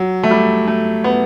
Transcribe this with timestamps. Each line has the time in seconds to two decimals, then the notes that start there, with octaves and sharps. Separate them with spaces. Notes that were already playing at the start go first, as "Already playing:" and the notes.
Already playing: F#3
0.23 A3
0.31 G3
0.68 A3
1.04 B3